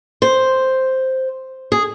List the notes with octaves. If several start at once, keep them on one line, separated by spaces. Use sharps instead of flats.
C5
G#4